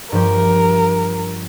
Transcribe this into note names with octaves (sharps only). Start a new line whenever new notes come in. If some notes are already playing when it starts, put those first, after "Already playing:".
G2 F3 G4 A#4